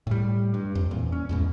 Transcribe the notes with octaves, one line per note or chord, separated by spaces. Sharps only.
A2 G3
G2
F2
E2 A#2
C#4
E2 G#2 B2